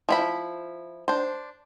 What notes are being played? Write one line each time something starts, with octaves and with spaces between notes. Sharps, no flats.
F3 E4 B5
D4 C5